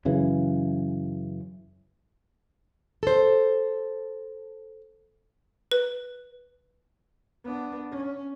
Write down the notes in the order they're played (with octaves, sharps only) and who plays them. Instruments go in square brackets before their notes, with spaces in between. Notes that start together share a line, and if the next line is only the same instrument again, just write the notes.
[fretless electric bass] F#2 C#3 E3
[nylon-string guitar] A4 C5
[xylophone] B4
[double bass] B3 D4
C#4